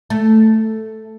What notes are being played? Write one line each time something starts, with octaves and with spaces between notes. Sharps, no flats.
A3